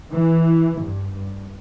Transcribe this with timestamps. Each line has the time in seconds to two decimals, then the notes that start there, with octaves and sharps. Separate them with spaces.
0.11 E3
0.79 G2
1.13 G2